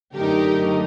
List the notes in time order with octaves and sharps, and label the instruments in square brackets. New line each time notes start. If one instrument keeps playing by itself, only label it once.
[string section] F#2 D3 A3 D#4 G4 A#4